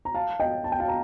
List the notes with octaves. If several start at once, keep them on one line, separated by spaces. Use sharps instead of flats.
A#5
F5 A5
D#5 G5
A5
G5
F5 A5
A#5